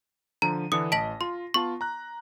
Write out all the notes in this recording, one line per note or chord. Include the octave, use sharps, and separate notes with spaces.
D3 F3 A#5 D#7
D3 E3 D4 D#6 C#7
A1 D#5 A5 A#6 B6 F#7
F4 C6
B3 F4 A5 C#6
A#5 F#6